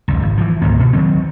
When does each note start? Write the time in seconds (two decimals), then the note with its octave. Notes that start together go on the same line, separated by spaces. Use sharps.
0.08 D#1 G#1 C#2
0.22 G#1
0.37 E3 F3
0.62 C#2 G#2 D#3 A#3
0.79 B2
0.93 D#3 F#3 C4